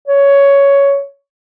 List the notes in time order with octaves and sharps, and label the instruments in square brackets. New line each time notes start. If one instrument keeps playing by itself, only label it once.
[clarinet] C#5